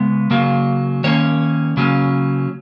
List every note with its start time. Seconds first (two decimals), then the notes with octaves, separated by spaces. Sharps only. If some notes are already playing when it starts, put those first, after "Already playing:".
Already playing: C#3 G#3 B3
0.31 C#3 F#3 A#3
1.04 D#3 A#3 C#4 C#5
1.77 C#3 F#3 A#3 C#4